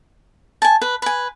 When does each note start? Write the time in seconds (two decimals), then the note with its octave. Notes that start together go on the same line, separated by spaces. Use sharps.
0.62 G#5 A5
0.82 B4
1.02 B4 G#5